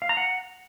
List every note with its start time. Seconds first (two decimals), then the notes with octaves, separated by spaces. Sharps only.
0.02 F5
0.09 A#5
0.17 F#5